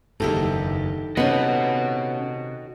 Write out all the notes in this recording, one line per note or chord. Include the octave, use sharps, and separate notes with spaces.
F#1 E2 G2 D#3 G4 A4
C3 B3 C#4 F#4 D#5